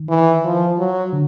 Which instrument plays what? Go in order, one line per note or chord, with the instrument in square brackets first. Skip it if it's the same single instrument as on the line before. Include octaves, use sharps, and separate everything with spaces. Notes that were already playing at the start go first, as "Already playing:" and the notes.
Already playing: [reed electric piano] D#3
[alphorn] E3
F3
F#3
[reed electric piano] D3